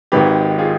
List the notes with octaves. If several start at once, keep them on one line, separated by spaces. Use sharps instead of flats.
G#1 G#2 D#3 G4 B4
F4 G#4